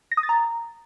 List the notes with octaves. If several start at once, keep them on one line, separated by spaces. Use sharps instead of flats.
A#6
D#6
A6
A#5